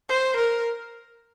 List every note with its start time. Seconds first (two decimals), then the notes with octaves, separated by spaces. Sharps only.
0.09 C5
0.36 A#4